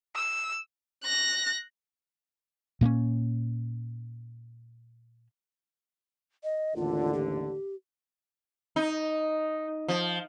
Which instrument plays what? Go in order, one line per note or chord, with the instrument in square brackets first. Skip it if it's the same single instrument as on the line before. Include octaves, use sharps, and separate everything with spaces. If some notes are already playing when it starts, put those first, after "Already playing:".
[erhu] E6
[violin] F#6 A#6
[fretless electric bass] A#2 A#3 B3 C#4
[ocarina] D#5
[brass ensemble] A1 D#2 D3 [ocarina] F4
[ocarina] G4
[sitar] D#4
F3